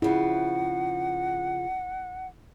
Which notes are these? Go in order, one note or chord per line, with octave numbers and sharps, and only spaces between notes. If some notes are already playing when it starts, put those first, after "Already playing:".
C#3 F3 C4 E4 F#5